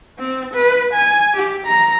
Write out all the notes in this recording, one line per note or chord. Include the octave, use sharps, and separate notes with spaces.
C4
B4
G#5
G4
A#5